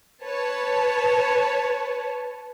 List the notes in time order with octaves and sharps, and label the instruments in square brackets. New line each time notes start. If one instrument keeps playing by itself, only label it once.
[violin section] B4 C#5 A5